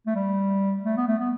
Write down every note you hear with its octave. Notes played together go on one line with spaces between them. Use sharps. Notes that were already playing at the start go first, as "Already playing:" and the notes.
A3
G3
A3
B3
A3
B3